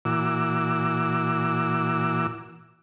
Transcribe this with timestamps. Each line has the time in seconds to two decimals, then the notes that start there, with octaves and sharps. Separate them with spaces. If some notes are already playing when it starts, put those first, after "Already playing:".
0.05 A#2 E3 F#4 D6 E6